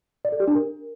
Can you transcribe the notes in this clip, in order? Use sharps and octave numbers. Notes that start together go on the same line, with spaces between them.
D5
A4
G4
D4
A#4